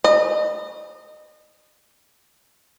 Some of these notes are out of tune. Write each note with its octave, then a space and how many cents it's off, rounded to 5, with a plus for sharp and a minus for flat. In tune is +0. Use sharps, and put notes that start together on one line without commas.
D#5 -30